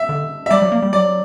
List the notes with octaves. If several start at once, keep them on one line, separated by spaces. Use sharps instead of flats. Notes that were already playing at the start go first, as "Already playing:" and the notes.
Already playing: E5
D3
E5
G3 D5
F#3
A#3
G3
F#3 D5